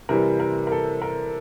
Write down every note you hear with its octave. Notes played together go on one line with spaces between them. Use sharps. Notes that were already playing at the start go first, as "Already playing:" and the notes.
C3 E3 G3 A#4
A#4
A#4
A4
A#4